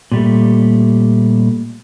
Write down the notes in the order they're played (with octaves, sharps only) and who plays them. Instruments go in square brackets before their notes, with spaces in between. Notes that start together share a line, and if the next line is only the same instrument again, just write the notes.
[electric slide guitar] A#2 G3 A3